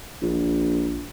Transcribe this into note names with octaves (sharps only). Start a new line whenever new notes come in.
A#1